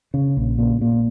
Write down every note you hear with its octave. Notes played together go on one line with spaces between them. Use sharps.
C#3
A#1
A#2
A#2